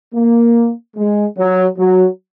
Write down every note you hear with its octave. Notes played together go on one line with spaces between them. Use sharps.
A#3
G#3
F#3
F#3